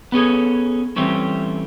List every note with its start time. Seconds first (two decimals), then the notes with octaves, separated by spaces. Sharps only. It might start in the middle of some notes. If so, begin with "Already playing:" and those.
0.12 B3 C#4 G#4 A4
0.96 E3 G3 A3 C4 C#4